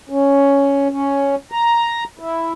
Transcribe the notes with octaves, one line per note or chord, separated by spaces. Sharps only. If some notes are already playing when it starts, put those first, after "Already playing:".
C#4
C#4
A#5
E4